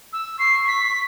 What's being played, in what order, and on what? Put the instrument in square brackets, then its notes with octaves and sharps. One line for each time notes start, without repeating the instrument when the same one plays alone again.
[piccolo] E6
[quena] C#6 [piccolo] C7
[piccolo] B6